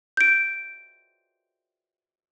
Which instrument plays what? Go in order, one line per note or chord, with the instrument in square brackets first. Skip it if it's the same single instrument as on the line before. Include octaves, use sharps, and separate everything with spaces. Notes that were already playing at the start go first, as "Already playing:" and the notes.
[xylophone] G6 D7